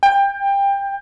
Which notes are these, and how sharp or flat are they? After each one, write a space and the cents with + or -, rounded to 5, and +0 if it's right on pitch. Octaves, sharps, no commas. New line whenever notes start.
G5 +20